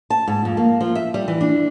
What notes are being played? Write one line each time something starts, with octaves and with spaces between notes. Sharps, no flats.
A5
G#2
F2
A#3
F3
E5
G3
E3
D4